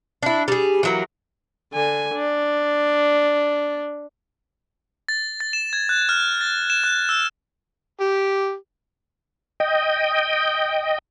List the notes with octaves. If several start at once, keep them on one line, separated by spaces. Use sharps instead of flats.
D4 E4
G3 G#4
E3 F#3 A#3
D3 G#5
D4
A6
A6
E7
G#6
F#6
F6
A6
E7
F#6
E6
G4
D#5 G5